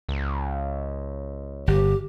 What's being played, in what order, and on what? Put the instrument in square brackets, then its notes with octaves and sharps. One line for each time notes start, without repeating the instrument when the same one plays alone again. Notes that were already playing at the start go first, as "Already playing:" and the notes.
[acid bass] C#2
[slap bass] G1 [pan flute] G4